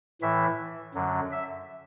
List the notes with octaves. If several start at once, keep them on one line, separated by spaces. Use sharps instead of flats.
A2 E3 E5
F#2 D3 F#3
E5